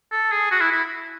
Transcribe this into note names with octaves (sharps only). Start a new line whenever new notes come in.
A4
G#4
F#4
E4
E4